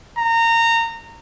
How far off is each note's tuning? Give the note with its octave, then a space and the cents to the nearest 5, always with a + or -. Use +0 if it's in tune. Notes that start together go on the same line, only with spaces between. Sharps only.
A#5 -20